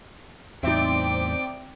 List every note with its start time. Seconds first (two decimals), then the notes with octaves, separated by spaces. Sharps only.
0.63 E2 A2 C4 D#4 D5 E5 G5 D6